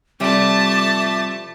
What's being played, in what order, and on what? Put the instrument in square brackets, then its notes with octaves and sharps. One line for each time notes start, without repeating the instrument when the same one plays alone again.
[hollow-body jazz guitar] C3 G3 [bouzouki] F3 E4 D5 [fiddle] A3 A5 [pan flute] D6